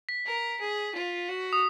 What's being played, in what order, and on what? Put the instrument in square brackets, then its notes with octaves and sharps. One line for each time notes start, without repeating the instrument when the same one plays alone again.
[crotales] B6
[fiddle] A#4
G#4
F4
F#4
[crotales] D#6